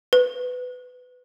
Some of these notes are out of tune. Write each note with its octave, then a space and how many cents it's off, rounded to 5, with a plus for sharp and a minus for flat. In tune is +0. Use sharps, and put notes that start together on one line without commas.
B4 +20